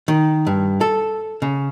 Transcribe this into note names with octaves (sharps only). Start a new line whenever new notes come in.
D#3
G2
A4
C#3